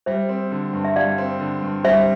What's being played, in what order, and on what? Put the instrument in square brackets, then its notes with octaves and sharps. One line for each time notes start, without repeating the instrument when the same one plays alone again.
[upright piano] G3 [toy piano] C5 E5
[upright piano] C4
D3
G2
[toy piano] E5
[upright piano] G3 [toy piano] D5 F5
[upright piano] C4
D3
G2
[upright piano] G3 [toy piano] C5 E5